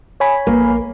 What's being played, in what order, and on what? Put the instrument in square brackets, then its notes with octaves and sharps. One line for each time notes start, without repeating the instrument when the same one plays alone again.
[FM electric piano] C#5 G#5 B5
[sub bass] A#1 [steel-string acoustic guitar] A#3